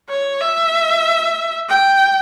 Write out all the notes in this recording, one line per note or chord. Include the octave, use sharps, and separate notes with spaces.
C#5
E5
G5